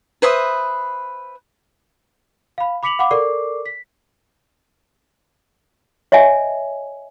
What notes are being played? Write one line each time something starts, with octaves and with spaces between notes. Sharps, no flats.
B4 C5 E5 D#6
F5 B5
B5 D6 B6 C#7 F7 F#7
F5 F#5 B5 D6
A4 A#4 D5 C#6 D6 C7
B6
C#5 D#5 E5 G#5